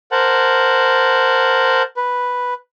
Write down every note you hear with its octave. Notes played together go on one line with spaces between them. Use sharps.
A#4 C5 F#5 A5
B4